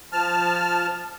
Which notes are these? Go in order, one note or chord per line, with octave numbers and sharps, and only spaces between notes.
F3 A5 F6